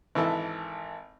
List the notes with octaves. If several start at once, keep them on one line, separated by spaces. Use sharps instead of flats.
G#1 E3 A4 E5